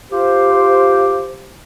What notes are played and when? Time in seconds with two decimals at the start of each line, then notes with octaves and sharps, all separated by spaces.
0.11 F4 G4 C5